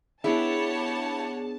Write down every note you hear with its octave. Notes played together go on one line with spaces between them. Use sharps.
B3 D4 E4 G4 G#4 C#5 F#5 A5